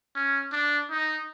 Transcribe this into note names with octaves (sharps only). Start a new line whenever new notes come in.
C#4
D4
D#4